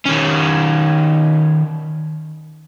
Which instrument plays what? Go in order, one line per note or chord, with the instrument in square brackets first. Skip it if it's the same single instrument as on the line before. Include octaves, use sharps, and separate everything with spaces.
[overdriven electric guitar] D#3 C#4